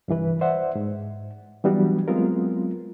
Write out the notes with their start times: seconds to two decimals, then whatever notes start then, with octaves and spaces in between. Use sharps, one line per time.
0.08 C2 G2 E3 B4
0.41 C5 D5 E5 F#5
0.75 G#2
1.64 E3 F#3 G3 B3 D4 F#4
2.08 F#3 G#3 B3 C4 F4 A#4